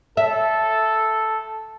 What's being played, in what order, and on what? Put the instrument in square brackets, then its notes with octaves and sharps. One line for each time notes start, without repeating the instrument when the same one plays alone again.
[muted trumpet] A4 [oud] E5